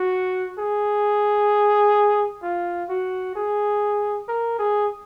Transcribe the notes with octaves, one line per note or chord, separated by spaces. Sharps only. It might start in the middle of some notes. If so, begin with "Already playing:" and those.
Already playing: F#4
G#4
F4
F#4
G#4
A#4
G#4